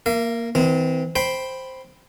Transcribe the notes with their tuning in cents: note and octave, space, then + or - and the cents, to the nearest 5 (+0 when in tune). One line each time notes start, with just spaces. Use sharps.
A#3 +0 F5 -45
E3 -40 C4 -30
C5 +0 G5 +0 B5 +0